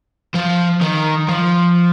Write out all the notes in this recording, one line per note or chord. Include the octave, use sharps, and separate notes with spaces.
F3
D#3
F3